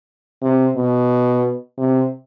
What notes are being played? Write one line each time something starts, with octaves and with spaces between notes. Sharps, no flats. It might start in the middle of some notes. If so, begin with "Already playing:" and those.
C3
B2
C3